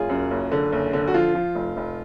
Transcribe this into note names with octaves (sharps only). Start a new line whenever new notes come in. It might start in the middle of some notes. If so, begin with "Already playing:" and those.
Already playing: F#1 F4 G#4
F#2
F#1
D3
F#1
D3
F#4
F3 F4
F3
F1
F1